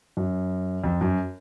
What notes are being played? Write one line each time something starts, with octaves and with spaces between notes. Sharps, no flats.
F#2
F2
F#2